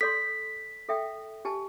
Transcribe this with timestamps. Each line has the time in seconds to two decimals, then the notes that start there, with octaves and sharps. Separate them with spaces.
0.01 A4 D5 C6 B6
0.89 A4 E5 G5
1.45 G4 G#5 A5